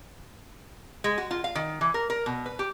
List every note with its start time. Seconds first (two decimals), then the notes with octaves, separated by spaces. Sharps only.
1.04 G#3
1.18 F#4
1.31 F4
1.44 F5
1.55 D#3
1.81 E3
1.94 A#4
2.10 A#4
2.26 B2
2.46 B4
2.59 G4